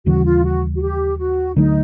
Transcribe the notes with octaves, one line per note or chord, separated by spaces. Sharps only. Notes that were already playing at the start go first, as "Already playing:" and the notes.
D#2 C#3 E3 G3 F#4
F4
F#4
F#4
G4
F#4
D2 D3 F#3 A3 D#4